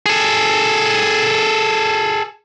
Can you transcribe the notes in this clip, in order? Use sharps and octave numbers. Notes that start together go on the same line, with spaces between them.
G#4 A4